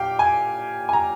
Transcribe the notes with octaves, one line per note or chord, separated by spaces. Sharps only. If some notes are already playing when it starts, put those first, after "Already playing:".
Already playing: A#2 G4 F5 G5
G#5
G#5
A#5